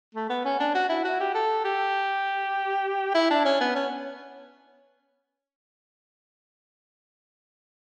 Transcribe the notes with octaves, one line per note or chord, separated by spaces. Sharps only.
A3
B3
C#4
D4
F#4
E4
F#4
G4
A4
G4
E4
D4
C#4
B3
C#4